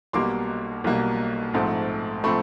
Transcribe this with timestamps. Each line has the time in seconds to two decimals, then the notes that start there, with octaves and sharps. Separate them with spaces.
0.13 B1 B2 G3 A#3 C6 D6
0.84 B1 B2 G3 A#3
1.53 A#1 G#2 F3 A3 C4
2.24 F3 A3 C4 B5 C#6